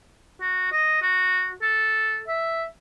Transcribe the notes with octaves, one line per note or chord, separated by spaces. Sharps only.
F#4
D#5
F#4
A4
E5